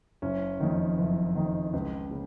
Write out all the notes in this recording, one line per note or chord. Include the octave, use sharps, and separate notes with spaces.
F#1 C#4
F2 D#3
F#1
F2 D#3
C#2
C#3